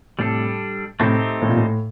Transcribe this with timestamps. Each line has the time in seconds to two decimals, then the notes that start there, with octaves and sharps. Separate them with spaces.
0.18 A2 C3 G3 D4 A4
1.00 A2 C3 A3 C4 D#4 G4 C5
1.42 A2
1.49 A#2
1.56 A2